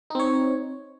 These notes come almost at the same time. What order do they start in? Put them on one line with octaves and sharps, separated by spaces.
D#4 C4 C#5